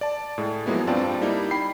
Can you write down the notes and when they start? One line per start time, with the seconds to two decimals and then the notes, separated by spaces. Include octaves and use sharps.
0.01 D5 A5
0.38 A2 G#3
0.66 F3 F#3 G#3 A#3 B3 E4
0.87 G2 C4 F4 D5 G5 A5
1.21 G3 A#3 D#4 E4
1.51 G5 B5 C7